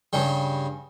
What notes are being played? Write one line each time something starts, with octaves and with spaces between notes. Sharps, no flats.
G2 C#3 G3